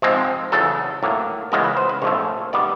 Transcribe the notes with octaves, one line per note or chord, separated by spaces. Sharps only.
G#2 F3 G#3 C4
E2 C#3 F#3 A4
A2 F#3 A#3
C#2 C#3 E3 G#3 B3 A#4
B4
C5
B4
A#1 G#2 F3 A3 C#5
D#3 G3 B3 D5